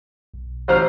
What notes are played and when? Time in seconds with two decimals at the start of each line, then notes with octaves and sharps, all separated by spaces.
0.34 B1
0.68 A1 C5 F6